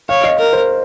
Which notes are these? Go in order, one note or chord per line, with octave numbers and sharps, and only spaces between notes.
C#5 F5
D#5
A#4
C5